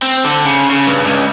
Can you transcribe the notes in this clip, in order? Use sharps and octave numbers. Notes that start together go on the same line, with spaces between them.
C4
D3
C#3
C#3
G2
C#2